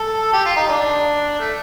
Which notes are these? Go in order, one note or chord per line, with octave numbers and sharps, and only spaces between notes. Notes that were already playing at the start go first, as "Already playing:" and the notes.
Already playing: A4
G4
F4
D#4
D4
A3